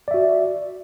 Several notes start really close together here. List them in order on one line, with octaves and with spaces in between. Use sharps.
D5 E5 F#4